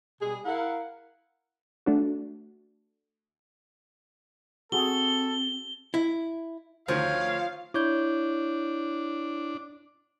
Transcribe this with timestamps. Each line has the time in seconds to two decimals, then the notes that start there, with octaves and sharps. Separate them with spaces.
0.22 B2 G3 G#4
0.45 E4 A#4 F5 F#5
1.86 A3 D4 F#4
4.72 C4 F#4 G#4 A4 G7
5.94 E4
6.88 D2 D#3 F3 C#5 F5
7.74 D4 E4 C#5 G6